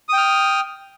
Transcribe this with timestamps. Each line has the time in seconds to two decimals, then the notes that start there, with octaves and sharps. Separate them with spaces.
0.09 D#6
0.13 G5
0.17 F6